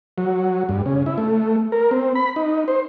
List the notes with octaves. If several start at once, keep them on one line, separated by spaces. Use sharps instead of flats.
F#3
G2
C#3
E4
A3
A#4
C4
B5
D#4
C5